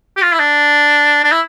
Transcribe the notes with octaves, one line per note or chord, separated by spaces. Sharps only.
G4
F4
E4
D4
D4
E4